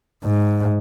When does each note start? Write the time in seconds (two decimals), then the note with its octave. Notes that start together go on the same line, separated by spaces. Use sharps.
0.24 G#2